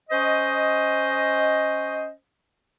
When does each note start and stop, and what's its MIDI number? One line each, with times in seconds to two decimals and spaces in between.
0.09 2.09 61
0.09 2.09 72
0.09 2.09 75